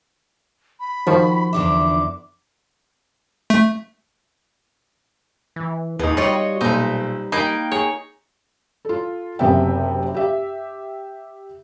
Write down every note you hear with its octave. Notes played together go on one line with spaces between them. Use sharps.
B5
D#3 F3 F#4
E2 D3 E5 D6
A3
E3
D#2 A2 B3 D#4 G#4
G3 F4 F#4 C#5 D#5
B1 A#2 D#4 B4 C5
A#3 D#4 G5 B5
G#4 C#5
F4 A4
F#1 C3 B3 E5 G5
G4 E5